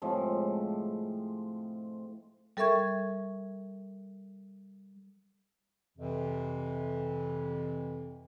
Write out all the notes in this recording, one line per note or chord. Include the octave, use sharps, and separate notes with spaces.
A2 C3 F3 G#3
G3 A4 A#4 E5 C#6 G#6
F2 C3 E3